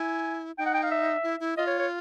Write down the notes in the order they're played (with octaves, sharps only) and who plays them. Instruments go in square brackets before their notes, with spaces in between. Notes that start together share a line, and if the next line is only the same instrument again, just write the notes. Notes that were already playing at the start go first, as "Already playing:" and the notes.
Already playing: [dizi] E4 [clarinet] G#5
[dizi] D#4 [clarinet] G5
[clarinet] F#5
G5
F5
E5
[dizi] E4
E4
[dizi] F4 [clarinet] D#5
[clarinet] C#5
C#5